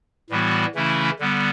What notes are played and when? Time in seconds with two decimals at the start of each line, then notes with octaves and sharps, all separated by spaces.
0.30 A2 E3 G3 B3 F#4
0.75 C#3 E3 A3 C#4 E4
1.19 D3 G3 B3